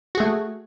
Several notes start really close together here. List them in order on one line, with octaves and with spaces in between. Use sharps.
F#4 G#4 A3